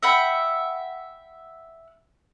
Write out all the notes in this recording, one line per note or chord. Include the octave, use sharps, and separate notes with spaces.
E5 F#5 G5 B5